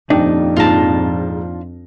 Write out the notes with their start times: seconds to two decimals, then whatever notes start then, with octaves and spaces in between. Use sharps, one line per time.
0.10 D#1 F2 D4 D#4 G5
0.57 A#1 G#2 F4 A5 A#6